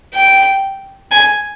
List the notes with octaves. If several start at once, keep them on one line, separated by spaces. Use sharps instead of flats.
G5
G#5